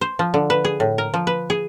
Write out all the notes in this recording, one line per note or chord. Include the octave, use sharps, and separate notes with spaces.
C5
F3
D3
B4
G#4
A2
A#4
F3
B4
G#4